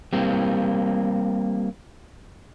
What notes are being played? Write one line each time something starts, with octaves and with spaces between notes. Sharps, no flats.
G3 A#3 C4